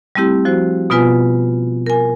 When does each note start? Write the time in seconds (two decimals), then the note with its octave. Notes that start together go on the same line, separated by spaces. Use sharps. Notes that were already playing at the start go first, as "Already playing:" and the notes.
0.15 G3 A3 C4 E4 G4
0.45 F3 F#4 C5
0.90 B2 B3 F4 B4 G#5
1.86 A#4 G#5